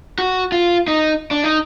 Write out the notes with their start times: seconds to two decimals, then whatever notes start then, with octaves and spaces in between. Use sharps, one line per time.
0.18 F#4
0.52 F4
0.88 D#4
1.31 D4
1.44 D#4